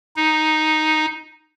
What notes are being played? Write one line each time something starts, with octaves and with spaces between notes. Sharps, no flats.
D#4